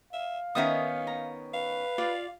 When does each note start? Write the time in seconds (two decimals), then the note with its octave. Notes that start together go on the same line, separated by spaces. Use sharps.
0.13 E5 F5
0.55 D#3 B3 C#4 D#4 A#4 E5 D#6
1.07 A#5
1.54 B4 F5
1.98 F4 D5